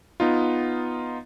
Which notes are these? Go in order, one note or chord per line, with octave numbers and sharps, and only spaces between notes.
B3 D#4 F4